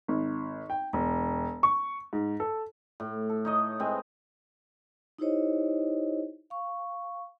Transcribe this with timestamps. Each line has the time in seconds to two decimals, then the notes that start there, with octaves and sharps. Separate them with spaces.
0.08 G#1
0.70 G5
0.93 E1
1.63 C#6
2.13 G#2
2.40 A4
3.00 A2
3.29 A4
3.45 D#4 C#5 D#5
3.80 G#3 C4 B4
5.19 D#4 E4 G4 C5 C#5 D#5
6.50 F5 C#6